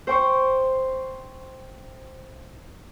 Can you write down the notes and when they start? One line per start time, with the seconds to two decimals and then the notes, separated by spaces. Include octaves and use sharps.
0.07 C5 G5 C#6